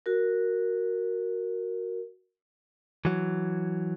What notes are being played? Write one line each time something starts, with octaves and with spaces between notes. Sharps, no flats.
F#4 A#4
E3 F#3